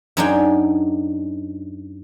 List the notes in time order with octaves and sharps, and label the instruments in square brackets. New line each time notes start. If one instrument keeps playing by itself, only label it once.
[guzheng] F#2 F#3 D4 D#4 G#4 G5